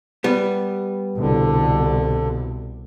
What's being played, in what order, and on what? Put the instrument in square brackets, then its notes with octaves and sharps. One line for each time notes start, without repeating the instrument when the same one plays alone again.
[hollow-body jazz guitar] G3 B3
[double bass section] C2 B2 [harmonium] D3